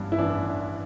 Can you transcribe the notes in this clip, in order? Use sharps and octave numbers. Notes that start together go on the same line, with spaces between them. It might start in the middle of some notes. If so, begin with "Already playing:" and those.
Already playing: A1 G2
E4
A1 D4